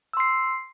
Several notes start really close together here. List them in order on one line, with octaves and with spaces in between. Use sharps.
E6 C6 C7